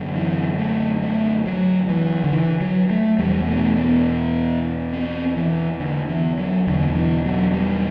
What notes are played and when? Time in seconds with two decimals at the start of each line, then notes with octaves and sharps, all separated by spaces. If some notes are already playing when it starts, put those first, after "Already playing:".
Already playing: F#2 D3
0.15 E3
0.58 A3
1.03 A3
1.46 F#3
1.89 E3
2.24 D3
2.33 E3
2.61 F#3
2.90 A3
3.18 E2 B2 G3
3.48 A3
3.77 B3
4.93 C4
5.37 E3
5.80 D3
6.09 E3
6.38 F#3
6.67 E2 B2 D3
6.95 E3
7.25 F#3
7.54 G3